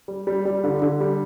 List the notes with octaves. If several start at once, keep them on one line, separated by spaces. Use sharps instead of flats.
G3
G3
G3
D3
D3
G3